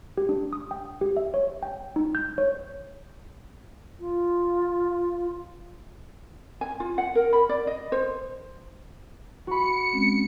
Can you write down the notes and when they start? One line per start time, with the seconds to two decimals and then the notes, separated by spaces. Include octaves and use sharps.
0.17 G4
0.29 D4
0.53 D#6
0.71 G5
1.01 G4
1.17 E5
1.34 C#5
1.63 G5
1.96 D#4
2.15 G6
2.38 C#5
4.00 F4
6.61 G#5
6.80 F4
6.98 F#5
7.15 A#4
7.33 B5
7.49 D5
7.67 D#5
7.92 C5
9.47 F#4 B5 C#7
9.93 G#3 C4 C#4